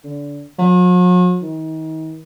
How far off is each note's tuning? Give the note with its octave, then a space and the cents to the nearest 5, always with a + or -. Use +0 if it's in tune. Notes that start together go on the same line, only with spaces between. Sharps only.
D3 -25
F#3 -45
D#3 +35